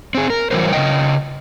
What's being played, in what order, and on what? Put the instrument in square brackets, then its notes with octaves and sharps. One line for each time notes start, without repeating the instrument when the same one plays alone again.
[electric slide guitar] C4 G#4
A#4
E3 F#3 G3 A#4 C5
C#3 B3 D#5 G5